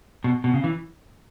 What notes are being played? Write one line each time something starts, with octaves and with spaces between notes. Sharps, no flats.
B2
B2
C#3
E3